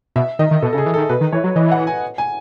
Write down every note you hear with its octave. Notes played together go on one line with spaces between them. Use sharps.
B2 E5
D#3 D#5
D#3
B2 A4
C#3 A4
G#4
E3
D#3 A4
B2 B4
D#3
E3 C#5
F#3
E3 D#5
F#5
G#5
G#5